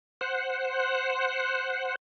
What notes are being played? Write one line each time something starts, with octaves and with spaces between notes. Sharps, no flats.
C5 F#5